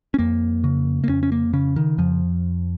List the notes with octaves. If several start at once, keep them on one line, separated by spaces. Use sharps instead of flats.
C#4
F2 A#3
C#3
A#3
F2 C#4
C#4
A#3
C#3 C#4
D#3
F2 F3